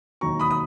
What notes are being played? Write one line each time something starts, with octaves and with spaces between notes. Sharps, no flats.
E1 D#2 D#3 F#3 A#5 C#6
B5 D#6
D#6